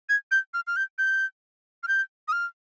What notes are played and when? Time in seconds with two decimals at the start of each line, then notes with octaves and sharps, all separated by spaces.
0.09 G#6
0.31 G6
0.54 F6
0.67 F6
0.76 G6
0.98 G6
1.83 F6
1.88 G6
2.28 D#6
2.32 F6